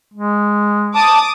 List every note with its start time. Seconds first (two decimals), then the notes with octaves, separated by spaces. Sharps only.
0.14 G#3
0.95 A5 D6 D#6